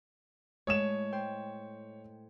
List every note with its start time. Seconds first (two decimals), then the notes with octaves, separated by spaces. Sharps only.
0.67 A2 G#3 C#5 D#6 E7
1.12 C5 G5